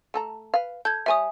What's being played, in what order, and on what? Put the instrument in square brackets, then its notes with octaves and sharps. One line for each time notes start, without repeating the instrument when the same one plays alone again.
[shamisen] A3 A4 A#5
B4 F5
[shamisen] A4 [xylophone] G6 G#6
[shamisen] G3 C5 C#5 [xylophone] E5 G#5 D#6